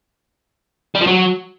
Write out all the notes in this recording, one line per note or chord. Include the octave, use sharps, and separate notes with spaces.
G3
F3
F#3